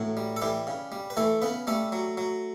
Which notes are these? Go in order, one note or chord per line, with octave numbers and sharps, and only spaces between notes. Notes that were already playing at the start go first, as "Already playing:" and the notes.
Already playing: A2 E3 F#3 F#4
G3
A4
E3 G3 G4
C#3
G3
B4
E3 A3 A4
C#3 B3 B4
G3 A3 A4
F#3
F#3